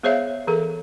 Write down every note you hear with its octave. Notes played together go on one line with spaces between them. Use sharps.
B3 G#4 C5 C#5 E5 F5
E3 G#4 A4